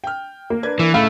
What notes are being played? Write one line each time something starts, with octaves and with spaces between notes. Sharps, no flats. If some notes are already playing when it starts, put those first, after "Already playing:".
G5 F6
A#3
D4 B4 G#6
E3
C#2 A2 A3 F5 B5